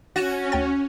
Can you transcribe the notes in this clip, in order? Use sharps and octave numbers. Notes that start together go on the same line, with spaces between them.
C#4 F#4 A6 D#7 E7
D2 G5 A6